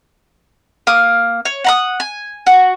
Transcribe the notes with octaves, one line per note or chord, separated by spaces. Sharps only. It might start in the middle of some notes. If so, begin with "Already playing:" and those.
A#3 D#6
C#5
F#5 A#5 D#6
G#5
F#4